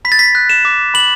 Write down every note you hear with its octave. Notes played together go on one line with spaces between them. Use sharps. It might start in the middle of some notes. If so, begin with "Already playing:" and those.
B5 B6
A6
B6
F#6
E7
D6
B5 F#7